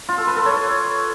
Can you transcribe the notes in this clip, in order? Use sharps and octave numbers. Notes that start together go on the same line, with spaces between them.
F4
A4
B4
A4
C#5